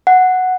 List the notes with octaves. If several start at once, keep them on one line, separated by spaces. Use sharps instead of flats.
F#5